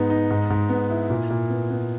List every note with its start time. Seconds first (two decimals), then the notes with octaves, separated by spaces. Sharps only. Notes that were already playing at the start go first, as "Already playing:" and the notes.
Already playing: G#2 B3 D#4
0.10 D#4
0.30 G#2
0.50 G#2
0.69 B3
0.90 E4
1.10 A#2
1.30 A#2
1.50 B3
1.70 B3